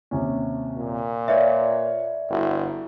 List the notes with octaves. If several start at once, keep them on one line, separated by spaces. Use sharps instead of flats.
D#2 C3 C#4
A#2
B4 C#5 D5 E5 F5
G1 E4 F#4 A4